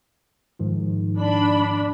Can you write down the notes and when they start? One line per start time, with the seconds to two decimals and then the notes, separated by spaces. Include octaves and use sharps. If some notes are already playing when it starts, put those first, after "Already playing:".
0.59 G#2 D#3 F3
1.20 D4 B5